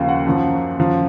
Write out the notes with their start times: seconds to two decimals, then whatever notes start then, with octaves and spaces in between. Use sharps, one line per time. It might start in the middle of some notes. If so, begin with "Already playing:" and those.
Already playing: D#2 C#3 F3 F5
0.09 F#5
0.26 F#2 F3
0.78 F#2 F3